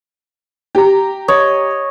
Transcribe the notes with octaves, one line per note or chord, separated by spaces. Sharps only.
G4 A#5
C#5 D#5